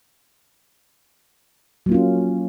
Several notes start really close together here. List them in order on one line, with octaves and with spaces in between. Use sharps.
F#3 A#3 F4 C#4